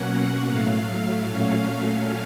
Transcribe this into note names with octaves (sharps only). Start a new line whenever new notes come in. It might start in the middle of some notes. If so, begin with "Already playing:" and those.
Already playing: B2 F#3 A#3 C#4 F#5
A2 F#3 A3 F5
A#2 F#3 A3 C#4 F5